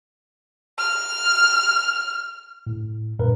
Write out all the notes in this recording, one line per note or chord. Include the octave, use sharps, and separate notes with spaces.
F6
A2
G2 A#2 A#4 B4